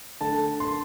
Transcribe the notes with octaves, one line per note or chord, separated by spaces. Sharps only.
D3 A3 A5
C6